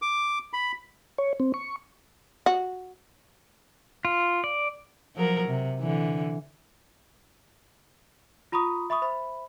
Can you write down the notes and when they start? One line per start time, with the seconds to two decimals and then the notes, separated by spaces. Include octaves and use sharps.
0.02 D6
0.53 B5
1.18 C#5
1.40 C4
1.54 C#6
2.46 F#4
4.05 F4
4.44 D5
5.16 F3 F#3 A#4
5.48 C3
5.80 D3 E3
8.52 F4 A#5 B5 C#6 D#6
8.90 E5 B5 C#6 D#6
9.02 C5 E5 B5